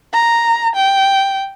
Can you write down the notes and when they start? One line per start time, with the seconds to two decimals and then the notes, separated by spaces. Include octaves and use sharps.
0.13 A#5
0.75 G5